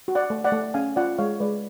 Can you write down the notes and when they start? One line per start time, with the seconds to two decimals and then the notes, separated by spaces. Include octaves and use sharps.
0.08 F#4
0.15 D5 F#5
0.30 A3
0.44 D5 F#5
0.52 A3
0.74 C#4 F5 G#5
0.96 F4 D5 F#5
1.18 G#3 C#5 F5
1.40 G#3 B4 D5